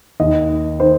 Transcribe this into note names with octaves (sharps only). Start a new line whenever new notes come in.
D#2 D#3 D#5
D#3 C5